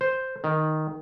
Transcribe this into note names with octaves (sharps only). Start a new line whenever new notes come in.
C5
D#3